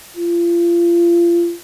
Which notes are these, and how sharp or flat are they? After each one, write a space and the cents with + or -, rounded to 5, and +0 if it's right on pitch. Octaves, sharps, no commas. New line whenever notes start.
F4 -30